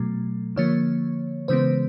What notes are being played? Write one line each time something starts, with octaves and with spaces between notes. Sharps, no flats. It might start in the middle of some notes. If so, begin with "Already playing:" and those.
Already playing: B2 F#3 A3
D3 F3 A#3 C#5
C#3 E3 G#3 B3 C5